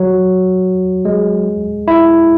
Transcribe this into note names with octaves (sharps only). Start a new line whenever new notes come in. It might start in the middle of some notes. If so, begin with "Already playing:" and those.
Already playing: F#3
G#3
E4